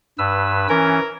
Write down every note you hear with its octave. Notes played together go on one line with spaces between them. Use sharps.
G2 B4 E6
E3 C#4 A#4